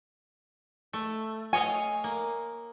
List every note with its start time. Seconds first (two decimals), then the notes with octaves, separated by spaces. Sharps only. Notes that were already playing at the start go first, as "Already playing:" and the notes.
0.93 A3
1.53 C#5 D#5 F5 G#5
2.04 A#3